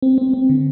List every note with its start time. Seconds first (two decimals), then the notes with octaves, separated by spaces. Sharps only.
0.02 C4
0.18 C4
0.33 C4
0.49 D3